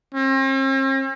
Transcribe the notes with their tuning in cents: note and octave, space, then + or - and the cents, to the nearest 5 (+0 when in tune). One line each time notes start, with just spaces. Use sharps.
C4 +45